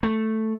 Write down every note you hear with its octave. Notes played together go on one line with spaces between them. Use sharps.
A3